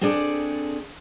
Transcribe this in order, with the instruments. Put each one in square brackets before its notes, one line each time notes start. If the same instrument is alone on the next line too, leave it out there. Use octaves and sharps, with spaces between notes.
[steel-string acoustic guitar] C4 D4 G#4 A4 D5